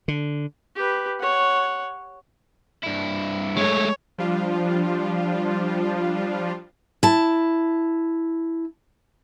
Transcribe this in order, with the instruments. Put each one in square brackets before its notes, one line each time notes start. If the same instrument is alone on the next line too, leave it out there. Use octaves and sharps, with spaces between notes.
[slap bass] D3
[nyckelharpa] G4 B4
C#5 F#5
[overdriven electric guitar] G2 E4
[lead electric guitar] G#3 A3 [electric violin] C#5
[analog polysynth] F3 G3 D4 F4
[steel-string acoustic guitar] E4 A5